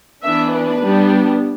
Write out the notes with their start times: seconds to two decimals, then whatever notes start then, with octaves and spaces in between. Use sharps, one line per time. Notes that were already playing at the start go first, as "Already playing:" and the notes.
0.23 E3 B3 D4 E5
0.53 B4
0.81 G3 B3 D4